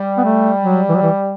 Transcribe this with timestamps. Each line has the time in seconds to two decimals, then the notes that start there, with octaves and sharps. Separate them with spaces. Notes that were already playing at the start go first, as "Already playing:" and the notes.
Already playing: G3
0.18 B3
0.25 A3
0.63 F#3
0.89 E3
0.95 F#3
1.03 E3